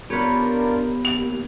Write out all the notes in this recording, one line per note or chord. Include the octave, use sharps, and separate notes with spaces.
B3 D4 F4 G4 A#4 B4 C#5
D#2 F7